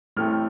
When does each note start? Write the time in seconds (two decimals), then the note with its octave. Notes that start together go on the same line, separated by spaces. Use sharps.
0.16 A1 A2 A3 C4 F6